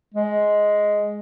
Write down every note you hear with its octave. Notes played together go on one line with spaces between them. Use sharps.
G#3